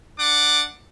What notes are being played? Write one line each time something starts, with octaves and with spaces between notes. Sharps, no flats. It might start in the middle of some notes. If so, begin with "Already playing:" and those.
D4 F#5 D6